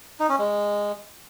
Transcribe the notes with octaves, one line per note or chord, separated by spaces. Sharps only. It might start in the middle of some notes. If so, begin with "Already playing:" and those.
D#4
C#4
G#3